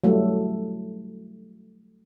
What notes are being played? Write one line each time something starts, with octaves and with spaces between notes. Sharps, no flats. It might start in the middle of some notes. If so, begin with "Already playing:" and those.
F#3 G3 A3 E4